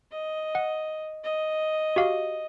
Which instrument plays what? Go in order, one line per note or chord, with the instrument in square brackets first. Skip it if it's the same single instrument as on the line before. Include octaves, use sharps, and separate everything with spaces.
[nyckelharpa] D#5
[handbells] F#5
[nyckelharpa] D#5
[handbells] F#4 G4 F5